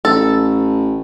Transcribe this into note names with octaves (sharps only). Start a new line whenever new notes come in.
A1 A4